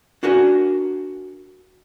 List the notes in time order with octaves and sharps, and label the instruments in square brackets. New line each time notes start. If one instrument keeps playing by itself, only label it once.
[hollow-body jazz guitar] D4 F#4 A#4 F#5 G#5